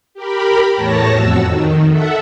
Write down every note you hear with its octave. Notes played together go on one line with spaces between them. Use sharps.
G4 A#4 B5
E2 A2 C#5 A5 A#6
F2 F#4 E6
D#3
A4 E5 F#5